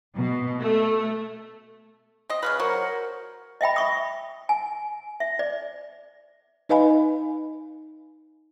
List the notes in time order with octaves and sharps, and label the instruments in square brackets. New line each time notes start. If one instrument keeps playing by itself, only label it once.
[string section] B2
A3
[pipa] C4 D#5
[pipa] C#3 G#3 B4 [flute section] F5 D#6 F6
[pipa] F#3 [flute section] A#4 C5 F#5
[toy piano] D#5 E5 G5 B5
E5 C#6 D#6
G#5
E5
D5
[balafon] D#4 B4 D#5 F5 G#5 B5